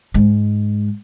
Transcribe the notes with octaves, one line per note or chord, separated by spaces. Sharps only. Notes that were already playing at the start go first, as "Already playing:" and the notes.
G#2 G#3